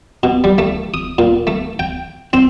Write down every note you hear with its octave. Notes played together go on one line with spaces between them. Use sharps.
B2
G3
A3
D#6
A#2
A3
G5
C4